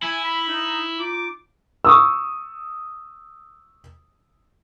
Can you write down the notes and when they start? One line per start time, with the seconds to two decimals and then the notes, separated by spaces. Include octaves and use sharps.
0.02 E4 G#5
0.24 B5
0.47 D#4
0.98 D#4 F4 D6
1.85 C#6 D#6 E6